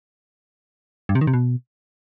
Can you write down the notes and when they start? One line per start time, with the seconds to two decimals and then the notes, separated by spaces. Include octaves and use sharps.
1.09 G2
1.15 C3
1.21 D#3
1.27 C3
1.33 B2